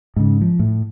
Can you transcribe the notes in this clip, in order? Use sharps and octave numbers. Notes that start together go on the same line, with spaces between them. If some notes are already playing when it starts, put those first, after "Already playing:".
G#2 C#3
F3
A2